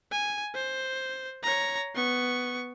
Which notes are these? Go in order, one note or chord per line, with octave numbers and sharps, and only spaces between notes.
G#5
C5
C#5 A#5
B3 C#6